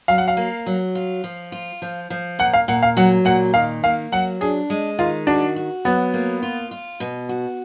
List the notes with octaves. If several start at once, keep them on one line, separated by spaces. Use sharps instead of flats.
F#3 F5
F#5
F5
A#3
F#3
F4
F3
F4
F3
F3
A#2 F#5
F5
A#2 F#5
F5
F#3 F#5
A#2 F#5
D#3 F5
A#3 F5
F#3 F#5
D4 G#4
G#3
D#3 F4
D4 F#4
F#4
F#3 B3
A#3
F4
F4
B2
F#4